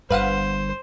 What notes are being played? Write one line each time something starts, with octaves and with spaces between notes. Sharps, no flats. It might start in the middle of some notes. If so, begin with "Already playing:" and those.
G1 G2 B4 C5 F5 F#5